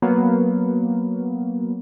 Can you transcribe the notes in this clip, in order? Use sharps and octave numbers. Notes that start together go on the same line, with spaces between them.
F#3 A#3 B3